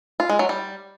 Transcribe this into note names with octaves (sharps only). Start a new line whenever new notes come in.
F4
G#3
F#3
G3